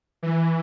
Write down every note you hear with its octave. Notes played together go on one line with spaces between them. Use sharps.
E3